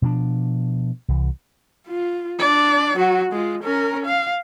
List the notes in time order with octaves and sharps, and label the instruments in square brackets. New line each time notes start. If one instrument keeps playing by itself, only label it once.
[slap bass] B2 F3 C4 D4
C2 E3
[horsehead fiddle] F4
D4 D5
F#3 F#4
G#3 F4
C#4 A#4
F5